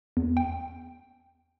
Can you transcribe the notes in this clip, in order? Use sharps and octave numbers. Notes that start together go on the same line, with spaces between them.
E2
G5